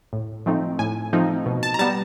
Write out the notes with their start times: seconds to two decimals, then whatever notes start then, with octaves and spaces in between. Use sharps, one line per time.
0.13 A2
0.46 F3 A3 C4 D#4
0.79 A2 G#5
1.13 F3 A3 C4 D#4
1.46 B2
1.63 A5
1.74 A#5
1.79 G3 B3 A5